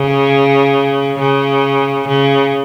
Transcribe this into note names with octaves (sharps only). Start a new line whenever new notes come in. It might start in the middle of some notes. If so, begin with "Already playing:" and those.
Already playing: C#3
C#3
C#3